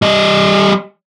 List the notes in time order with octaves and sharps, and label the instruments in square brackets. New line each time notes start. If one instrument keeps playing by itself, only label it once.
[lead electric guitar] G3 D#5